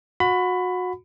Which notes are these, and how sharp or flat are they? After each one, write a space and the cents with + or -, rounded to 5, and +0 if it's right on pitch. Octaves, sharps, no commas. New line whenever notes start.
F#4 -25 B5 +20